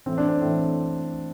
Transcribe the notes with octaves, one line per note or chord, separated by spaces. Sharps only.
A2 E3 C4
D4
C4
A2 E3